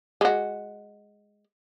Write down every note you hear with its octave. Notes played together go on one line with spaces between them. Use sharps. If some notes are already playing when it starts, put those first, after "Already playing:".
G#3 F#4